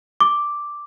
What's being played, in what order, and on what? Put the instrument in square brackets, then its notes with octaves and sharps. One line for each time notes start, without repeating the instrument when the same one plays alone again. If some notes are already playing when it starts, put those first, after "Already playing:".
[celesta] D6